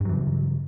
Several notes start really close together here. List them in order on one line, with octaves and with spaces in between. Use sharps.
G2 F#3 E3 C#3